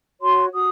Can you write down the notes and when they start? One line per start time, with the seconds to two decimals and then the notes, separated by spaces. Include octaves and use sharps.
0.21 F#4 C#5 C6
0.53 F#4 D#6